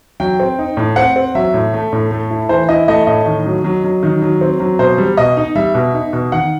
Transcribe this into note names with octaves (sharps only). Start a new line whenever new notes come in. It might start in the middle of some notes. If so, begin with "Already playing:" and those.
F#3 G5
C4
D#4
A2
C4 F#5
C4
F#3 E5
A2
A3
A2
A3
E4
E3 C5
E4 D#5
A3 D#5
A2 D#5
D#3
F#3
F#3
F#3
D#3
F#3
C4
F#3
B2 C5
G3
B2 D#5
D#4
G3 E5
B2
D#4
B2
D#3 F#5